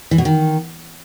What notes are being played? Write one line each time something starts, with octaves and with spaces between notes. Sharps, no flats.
E3
B2
D#3